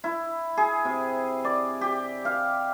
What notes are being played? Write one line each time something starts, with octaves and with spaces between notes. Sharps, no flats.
E4
G#4
C3
D5
G4
F5